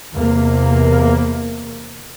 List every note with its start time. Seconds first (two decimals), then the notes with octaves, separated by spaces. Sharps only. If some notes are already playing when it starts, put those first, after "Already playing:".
0.15 E2 C3 A#3